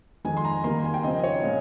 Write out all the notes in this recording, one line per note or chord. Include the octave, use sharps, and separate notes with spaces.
F2 D#3 G#3 G#5
C6
A#5
D#3 G3 A#3 C6
G#5
G5
C#3 F3 C4 D#4 D#5
C#5
A#2 G#3 C#4